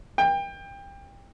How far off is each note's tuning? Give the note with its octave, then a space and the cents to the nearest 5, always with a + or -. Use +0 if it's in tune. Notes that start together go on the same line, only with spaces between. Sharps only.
G5 +25